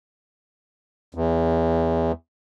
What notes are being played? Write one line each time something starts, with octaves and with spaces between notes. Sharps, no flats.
E2